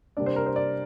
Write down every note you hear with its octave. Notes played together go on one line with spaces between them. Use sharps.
C3 G3 A#3 D4 D5
C5
A#4
C5
D5